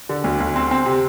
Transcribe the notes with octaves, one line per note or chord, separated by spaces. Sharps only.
D3
D2
D2
C4
C4
C3